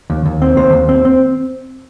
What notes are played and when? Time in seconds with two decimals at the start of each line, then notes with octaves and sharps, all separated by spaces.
0.10 D#2
0.26 D#2
0.42 C4
0.57 D#2 C5
0.73 D#2
0.89 C4
1.05 C4